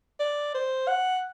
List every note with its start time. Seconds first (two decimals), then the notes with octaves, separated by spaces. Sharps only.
0.20 D5
0.54 C5
0.88 F#5